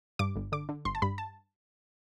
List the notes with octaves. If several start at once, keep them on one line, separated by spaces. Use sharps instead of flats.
G2 D6
G1
D3 D6
D3
G1 C6
A5
G2 B5
A5